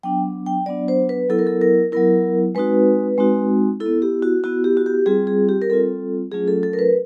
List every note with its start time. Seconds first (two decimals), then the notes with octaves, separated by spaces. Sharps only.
0.03 F#3 B3 D4 G5
0.46 G5
0.66 F#3 B3 D4 D5
0.88 C5
1.09 B4
1.29 F#3 B3 E4 A4
1.39 A#4
1.47 A4
1.61 A#4
1.92 F#3 B3 E4 A#4
2.55 G#3 C4 D#4 F#4 B4
3.18 G#3 C4 D#4 F#4
3.80 E4 A4
3.86 B3
4.02 G4
4.22 F#4
4.44 B3 E4 F#4
4.64 G4
4.77 F#4
4.86 G4
5.06 G3 C4 F4 G#4
5.27 G#4
5.49 G4
5.62 A#4
5.70 G3 C4 F4 A4
6.32 F#3 A3 C#4 F4 G#4
6.48 A4
6.63 A4
6.73 A#4
6.79 B4